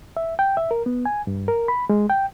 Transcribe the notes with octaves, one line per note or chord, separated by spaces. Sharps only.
E5
G5
E5
A#4
B3
G#5
G2
A#4
B5
G#3
G5